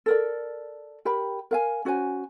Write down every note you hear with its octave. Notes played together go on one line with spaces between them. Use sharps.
A4 A#4 D5
G4 A#4 G5 B5
A#4 F5 G#5
C#4 F#4 C5 G#5